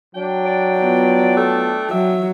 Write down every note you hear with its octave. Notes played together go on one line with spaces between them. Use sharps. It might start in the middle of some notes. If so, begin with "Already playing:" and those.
F#3 D4 G5
D5
B3 F4
A3
F#3 E5